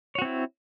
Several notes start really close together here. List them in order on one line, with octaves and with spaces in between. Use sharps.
C#5 F#4 C4 E4